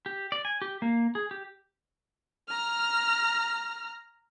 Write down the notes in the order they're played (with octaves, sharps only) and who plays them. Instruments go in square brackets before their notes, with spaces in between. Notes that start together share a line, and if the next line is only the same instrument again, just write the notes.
[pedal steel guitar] G4
D5
G#5
G4
A#3
G#4
G4
[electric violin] A#5 F6